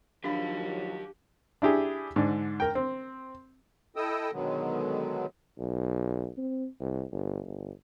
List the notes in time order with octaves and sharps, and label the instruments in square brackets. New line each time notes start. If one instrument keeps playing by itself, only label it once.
[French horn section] D#3 F3 F#3 [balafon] D4 B5 [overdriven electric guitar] G4 F5
[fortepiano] D4 E4 G4 G#4
G#2 D3 D4
A#4 G5
C4
[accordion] E4 A4 D#5 G5 D#6 E6
B2 D3 D#3 F#3 G#3 B3
[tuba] B1
C4
C2
G1
G1